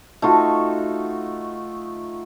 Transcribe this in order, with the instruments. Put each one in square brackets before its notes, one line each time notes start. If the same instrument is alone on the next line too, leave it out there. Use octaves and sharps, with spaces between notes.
[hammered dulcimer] A3 D#4 F4 F#4